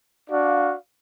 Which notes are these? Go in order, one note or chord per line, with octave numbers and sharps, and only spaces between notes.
D4 F#4 D5 F5